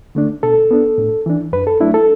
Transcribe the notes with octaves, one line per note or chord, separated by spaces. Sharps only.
D3 A3 D4
B2 A4
B3 D4
A2
E3 D4
F#2 B4
A4
F#3 A3 D4 E4
A4